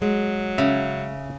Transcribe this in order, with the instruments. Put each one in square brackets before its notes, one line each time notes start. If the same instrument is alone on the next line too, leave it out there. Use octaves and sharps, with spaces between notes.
[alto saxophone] F#3 [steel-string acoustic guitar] G#3
[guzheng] C#3 [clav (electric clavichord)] E5